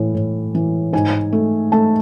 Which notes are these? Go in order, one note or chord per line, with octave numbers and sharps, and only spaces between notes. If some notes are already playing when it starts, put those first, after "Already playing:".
Already playing: A2 E3
A2
E3
G#2 G#5
A3
A3 A5